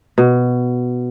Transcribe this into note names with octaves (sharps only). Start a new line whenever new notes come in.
B2